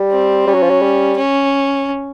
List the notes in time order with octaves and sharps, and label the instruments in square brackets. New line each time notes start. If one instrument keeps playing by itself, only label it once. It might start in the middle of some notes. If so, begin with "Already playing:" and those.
Already playing: [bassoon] G3
[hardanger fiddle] C4
[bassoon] G3 [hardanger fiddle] C#4
[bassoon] F#3
F3
F#3
G3
[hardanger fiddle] C#4